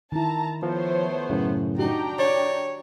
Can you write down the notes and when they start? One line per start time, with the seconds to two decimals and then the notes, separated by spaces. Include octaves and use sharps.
0.12 D#3 E4 A5 A#5
0.63 F3 A3 B3 C5 C#5
1.30 F#2 A2 C#3
1.79 D4 D#4 F#4 G4 G5 A#5
2.19 C#5 D5